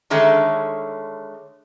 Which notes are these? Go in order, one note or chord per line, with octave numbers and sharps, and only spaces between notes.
D3 D#3 G#3 A3 C#4